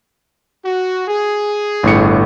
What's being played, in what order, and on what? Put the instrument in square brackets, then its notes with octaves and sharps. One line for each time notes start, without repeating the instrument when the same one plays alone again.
[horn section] F#4
G#4
[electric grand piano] G1 A2 C#7